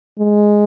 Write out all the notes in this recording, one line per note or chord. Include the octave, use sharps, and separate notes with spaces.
G#3